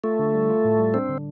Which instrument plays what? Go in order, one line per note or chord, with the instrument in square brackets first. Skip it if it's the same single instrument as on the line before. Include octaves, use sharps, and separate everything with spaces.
[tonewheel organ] A3 [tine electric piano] F4
[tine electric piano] D3
G3
F4
A2
G3
[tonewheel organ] C4 [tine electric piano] D4
[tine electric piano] D3